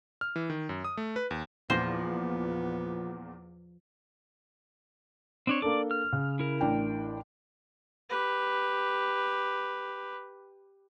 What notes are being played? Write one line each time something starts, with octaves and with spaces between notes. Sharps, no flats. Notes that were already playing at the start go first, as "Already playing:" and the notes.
F6
E3
D#3
F#2
D#6
A3
B4
D#2
E2 A#2 F3 B3 C5 A#6
C4 D4 C#5
A#3 D4 A4 D5 D6
F6
C#3
E4 A#4
A1 D4 G5
G4 B4